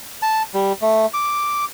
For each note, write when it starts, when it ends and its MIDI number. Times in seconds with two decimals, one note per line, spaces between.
0.22 0.43 81
0.54 0.73 55
0.82 1.06 57
1.14 1.65 86